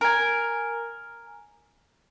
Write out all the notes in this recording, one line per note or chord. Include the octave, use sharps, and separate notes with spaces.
A#4 G#5